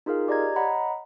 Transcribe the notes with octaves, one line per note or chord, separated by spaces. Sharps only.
D#4 F4 G#4 A#4 F5
G4 D5 D#5 A#5 G#6
C#5 D#5 F#5 A#5 B5